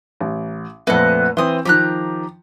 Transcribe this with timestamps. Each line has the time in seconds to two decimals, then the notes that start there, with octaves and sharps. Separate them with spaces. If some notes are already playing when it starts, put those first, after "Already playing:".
0.20 A1
0.87 F2 A#2 A3 B4 D#5 F#5
1.37 E3 C4 C6 D#6
1.65 D#3 F3 G4 A#5 F#6